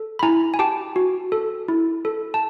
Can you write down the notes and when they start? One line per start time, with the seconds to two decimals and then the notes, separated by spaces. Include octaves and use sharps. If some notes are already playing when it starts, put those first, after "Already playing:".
Already playing: A4
0.19 B5
0.23 E4 G#5 A#5
0.54 G#5
0.59 G4 G5 A5
0.96 F#4
1.32 A4
1.68 E4
2.05 A4
2.34 A5